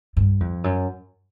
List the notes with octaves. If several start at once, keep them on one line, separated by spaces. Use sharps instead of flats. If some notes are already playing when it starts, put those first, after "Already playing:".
G2
F2
F#2